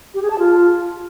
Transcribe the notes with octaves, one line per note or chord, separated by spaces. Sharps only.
G4
G#4
A5
F4